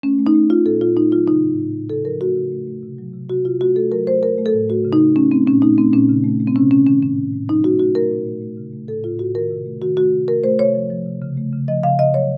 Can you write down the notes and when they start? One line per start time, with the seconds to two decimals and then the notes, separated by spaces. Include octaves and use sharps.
0.03 A3 C#4
0.19 A3
0.27 D#4
0.35 A3
0.50 A3 F4
0.65 A#2 A4
0.81 A#2 F4
0.96 A3 D#4
1.12 F#3 F4
1.28 C#3 D#4
1.43 A2
1.59 A2
1.74 A2
1.90 C#3 A4
2.05 F3 A#4
2.21 A3 F#4
2.37 C#3
2.52 A3
2.67 A3
2.83 C3
2.98 F#3
3.14 C3
3.29 C3 F#4
3.45 C3 F4
3.61 A3 F#4
3.76 A3 A4
3.91 F#3 A#4
4.07 A3 C5
4.23 A3 A#4
4.38 A3
4.46 A4
4.54 A2
4.69 A3 F#4
4.85 C#3
4.93 D#4
5.00 A3
5.16 A3 C#4
5.31 A3 C4
5.47 A#2 C#4
5.62 A3 D#4
5.78 A3 C4
5.93 A#2 C#4
6.09 C#3
6.24 A3
6.40 A3
6.47 C4
6.56 C3 C#4
6.71 D#3 C#4
6.87 D#3 C#4
7.02 A2 C#4
7.17 A2
7.33 A2
7.49 F#3 D#4
7.64 A3 F#4
7.79 A3 F#4
7.95 A3 A#4
8.11 A#2
8.26 A3
8.41 A3
8.57 C#3
8.73 A3
8.88 A2 A4
9.04 A2 F4
9.19 A2 F#4
9.35 D#3 A#4
9.51 C3
9.66 A3
9.82 D#3 F#4
9.97 A3 F#4
10.13 C3
10.28 A3 A#4
10.44 A3 C5
10.59 C3 C#5
10.75 F3
10.90 F3
11.06 C3
11.22 C#3
11.37 A3
11.53 C#3
11.68 F3 D#5
11.83 C#3 F5
11.99 C#3 D#5
12.14 F#3 C#5